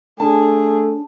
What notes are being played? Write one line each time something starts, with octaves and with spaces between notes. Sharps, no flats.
A3 C#4 D4 G#4 A5